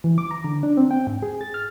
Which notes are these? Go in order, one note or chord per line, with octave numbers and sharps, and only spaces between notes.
E3
D6
A#5
D3
D4
C4
G5
G#2
G#4
A6
F6